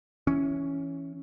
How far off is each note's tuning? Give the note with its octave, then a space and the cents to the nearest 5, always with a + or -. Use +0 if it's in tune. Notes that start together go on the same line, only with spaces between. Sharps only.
E3 +0 C#4 +0